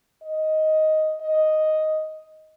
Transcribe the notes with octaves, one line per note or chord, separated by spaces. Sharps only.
D#5
D#5